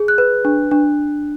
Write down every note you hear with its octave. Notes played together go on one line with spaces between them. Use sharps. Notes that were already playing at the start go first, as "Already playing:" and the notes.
Already playing: G#4
F#6
B4
D4
D4